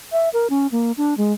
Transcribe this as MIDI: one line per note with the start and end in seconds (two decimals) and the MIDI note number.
0.12 0.29 76
0.33 0.47 70
0.50 0.67 61
0.72 0.92 58
0.97 1.17 62
1.17 1.33 56